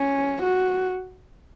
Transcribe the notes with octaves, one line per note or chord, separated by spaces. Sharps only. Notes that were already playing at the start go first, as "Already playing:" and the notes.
Already playing: C#4
F#4